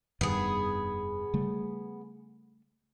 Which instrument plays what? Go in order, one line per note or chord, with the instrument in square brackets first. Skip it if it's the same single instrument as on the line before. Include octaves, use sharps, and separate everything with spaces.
[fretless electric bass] F1 G2 D#3 [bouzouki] B3 G#4
[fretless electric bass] C#3 G3 A3